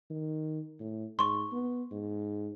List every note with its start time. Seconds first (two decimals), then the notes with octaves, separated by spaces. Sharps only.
0.10 D#3
0.80 A2
1.19 G#2 C6 C#6
1.52 B3
1.91 G#2